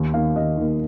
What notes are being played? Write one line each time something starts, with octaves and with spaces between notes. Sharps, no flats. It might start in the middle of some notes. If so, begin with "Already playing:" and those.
Already playing: D#2
D#3 A#3 F5
D#2 D#5
D#3 A#3